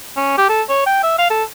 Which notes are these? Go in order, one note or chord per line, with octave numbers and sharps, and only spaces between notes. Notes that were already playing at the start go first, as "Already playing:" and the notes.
C#4
G4
A4
C#5
G5
E5
F5
A4